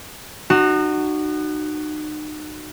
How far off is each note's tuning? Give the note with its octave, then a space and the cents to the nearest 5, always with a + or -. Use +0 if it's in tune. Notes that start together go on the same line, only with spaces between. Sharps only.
D#4 -35 F#4 +10